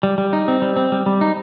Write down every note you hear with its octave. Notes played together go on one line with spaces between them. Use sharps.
G3
G3
D#4
C4
G3
C4
G3
G3
D#4